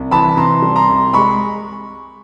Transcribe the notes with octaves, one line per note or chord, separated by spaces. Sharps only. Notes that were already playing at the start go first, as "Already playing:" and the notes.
Already playing: C2
E3 A5 B5
C3 A#5 C6
G3
A#5 C6
C2
G#3 B5 C#6